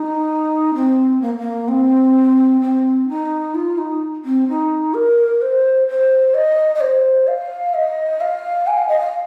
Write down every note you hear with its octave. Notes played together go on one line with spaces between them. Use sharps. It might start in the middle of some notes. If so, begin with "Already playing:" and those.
Already playing: D#4
C4
A#3
A#3
C4
C4
D#4
F4
D#4
C4
D#4
A#4
C5
C5
D#5
D#5
C5
F5
D#5
F5
G#5
F5
D#5
F5